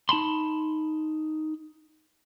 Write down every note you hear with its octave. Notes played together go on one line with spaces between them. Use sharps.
D#4 A5 B5 C6